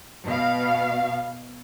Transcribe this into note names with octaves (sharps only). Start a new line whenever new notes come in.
B2 F5